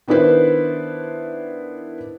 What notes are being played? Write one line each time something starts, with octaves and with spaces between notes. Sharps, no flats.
D#3 B3 D4 E4 B4 C5